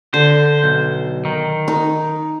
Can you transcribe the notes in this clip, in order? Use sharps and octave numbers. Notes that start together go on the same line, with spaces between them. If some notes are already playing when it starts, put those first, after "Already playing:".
D3 C5
B1
D#3
D#4